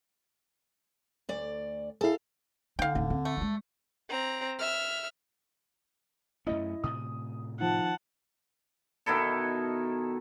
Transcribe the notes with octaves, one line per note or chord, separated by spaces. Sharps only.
D2 D5
E4 G#4 A4 F5
D3 D#4 F5 G5
D1 D#4
C4
A3
G3 G#3
C4 A#5
E5 F6
F#2 A3 C#4 E4 D#5
A2 C3 D#6
D#3 F3 F#5 A5
B2 D#3 E4 A4